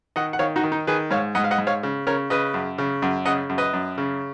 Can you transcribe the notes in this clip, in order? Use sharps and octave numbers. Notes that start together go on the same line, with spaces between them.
D#3 D#5 F#5
F#5
D#3 C#5 F5
D#4 F#4
D#3
D#4
D#3 G#4 B4
G#2 C#5 F5
G#2 D#5 F#5
F5
D#5 F#5
G#2
C#5 F5
C#3
C#3 A#4 C#5
C#3 B4 D#5
F#2
C#3
F#2
C#3 D#5 F#5
F#2
B4 D#5
F#2
C#3